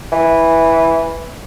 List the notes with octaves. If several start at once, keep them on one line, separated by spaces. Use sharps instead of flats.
E3